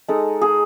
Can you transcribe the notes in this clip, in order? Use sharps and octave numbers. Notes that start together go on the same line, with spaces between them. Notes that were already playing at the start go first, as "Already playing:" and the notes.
G#3 D#4 A4
G#4